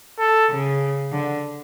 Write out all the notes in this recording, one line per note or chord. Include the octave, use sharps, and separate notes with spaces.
A4
C#3
D3